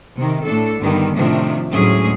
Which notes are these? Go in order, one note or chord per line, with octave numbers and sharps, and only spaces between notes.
C3 D#3
A2 D4 A4
G2 D3 D#3 G3 B3
A2 C3 D#3 F3 A3 D4
D2 A2 F#3 G#3 C#4 G#4